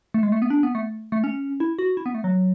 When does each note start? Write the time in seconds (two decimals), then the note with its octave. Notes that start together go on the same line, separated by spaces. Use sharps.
0.14 A3
0.23 G#3
0.32 A3
0.42 B3
0.50 D4
0.63 B3
0.75 A3
1.12 A3
1.24 C#4
1.60 E4
1.79 F#4
1.97 E4
2.06 B3
2.15 A3
2.24 F#3